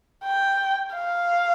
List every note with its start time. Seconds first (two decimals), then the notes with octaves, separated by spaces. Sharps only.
0.25 G5
0.95 F5